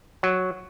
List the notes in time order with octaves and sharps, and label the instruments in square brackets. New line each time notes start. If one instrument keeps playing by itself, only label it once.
[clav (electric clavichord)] F#3